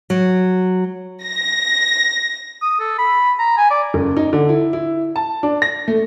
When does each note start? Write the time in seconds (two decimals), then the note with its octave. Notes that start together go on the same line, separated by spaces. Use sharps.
0.10 F#3
1.25 A#6
2.62 D#6
2.80 A4
2.98 B5
3.39 A#5
3.57 G#5
3.70 D5
3.94 F#1
4.17 D#4
4.33 D3
4.49 E4
4.73 E4
5.16 A5
5.43 D4
5.62 A#6
5.88 A3